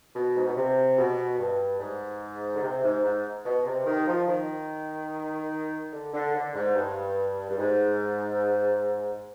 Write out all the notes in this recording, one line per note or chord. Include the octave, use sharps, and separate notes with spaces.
B2
G#2
B2
C3
B2
G2
G#2
D3
C3
G#2
G#2
B2
C3
D#3
F3
D#3
D3
D3
D3
G#2
G2
G2
G#2